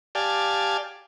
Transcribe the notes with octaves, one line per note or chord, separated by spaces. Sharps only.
G4 D5 F5 G#5 A5